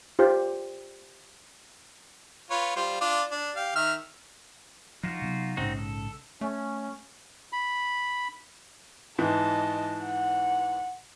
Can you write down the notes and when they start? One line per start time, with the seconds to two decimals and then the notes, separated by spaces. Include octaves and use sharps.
0.19 F4 G4 C5
2.51 F4 B4 C#5
2.76 G3 F4 C5
3.01 D4 F4 D6
3.31 D4
3.56 G4 F5
3.75 D#3 E5 F6
5.03 F3 D#4 F4 F#4
5.22 C3 F#3 B3
5.57 A#1 G#2 C#3 C4 D#4 F#4
5.79 A4
6.41 A3 C#4
7.53 B5
9.19 G#2 E3 D#5 A5
10.05 F#5